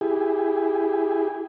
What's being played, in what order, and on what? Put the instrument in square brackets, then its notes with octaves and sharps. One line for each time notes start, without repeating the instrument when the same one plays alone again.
[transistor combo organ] E4 G4 G#4